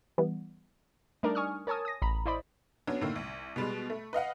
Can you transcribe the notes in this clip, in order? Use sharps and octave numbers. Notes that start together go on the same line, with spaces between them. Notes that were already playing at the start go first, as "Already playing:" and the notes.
E3 G3 B3
G3 A3 D4 D#4 A#4 D5
G#5 C#6 D#6 F6
A#4 C#5 G#5 A5 D#6
D#6 A#6
A1 A#5 B5
E4 C5 D5 D#5 B5
F#3 B3 C#4 D4
A2 D3 D#3 A#3
C2
B2 G3 G#3
A3
B4 D#5 F5 F#5